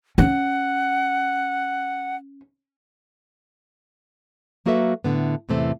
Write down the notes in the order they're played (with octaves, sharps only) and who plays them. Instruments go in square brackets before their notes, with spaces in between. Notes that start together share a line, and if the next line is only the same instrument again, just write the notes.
[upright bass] C#4 [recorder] F#5
[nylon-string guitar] F#3 A#3 F#4 A4 B4 E5
A2 D3 B3
E2 A2 C3 E3 A3 C4